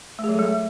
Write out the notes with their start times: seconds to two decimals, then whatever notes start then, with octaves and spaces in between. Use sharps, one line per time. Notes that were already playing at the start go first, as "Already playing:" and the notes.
0.19 A3
0.24 G#4
0.29 F#3
0.34 A4
0.39 G#3